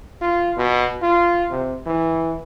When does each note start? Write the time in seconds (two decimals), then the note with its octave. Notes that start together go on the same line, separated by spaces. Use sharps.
0.21 F4
0.57 B2
1.02 F4
1.51 C3
1.86 E3